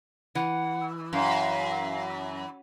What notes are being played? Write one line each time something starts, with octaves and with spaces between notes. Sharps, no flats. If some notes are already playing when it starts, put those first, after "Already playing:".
E3 F#5
F#2 F5